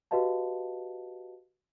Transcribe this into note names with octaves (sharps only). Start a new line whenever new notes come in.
F#4 G4 B4 D#5 F5 A5